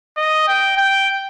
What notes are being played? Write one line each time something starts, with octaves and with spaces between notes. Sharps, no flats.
D#5
G5
G5